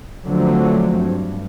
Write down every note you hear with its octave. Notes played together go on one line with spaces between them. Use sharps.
D3 F3 F#3 A3 C4
G2